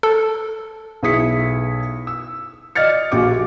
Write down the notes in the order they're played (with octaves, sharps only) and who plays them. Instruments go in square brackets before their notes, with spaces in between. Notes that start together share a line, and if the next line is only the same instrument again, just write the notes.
[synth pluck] A4
[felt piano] B1 E4 G#4 D#6 B6 C#7
E6
D5 D#5 F6 A6 C#7
A#1 F#4 G4 D6